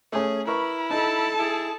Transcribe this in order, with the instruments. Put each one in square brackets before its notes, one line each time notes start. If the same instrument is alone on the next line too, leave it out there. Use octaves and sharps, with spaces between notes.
[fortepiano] A3 C#4 [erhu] G#4
[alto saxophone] E4 [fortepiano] A#4 B4 C#6 [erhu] B5
[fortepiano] D#4 [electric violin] A4 A5
[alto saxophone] E4 [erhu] G#4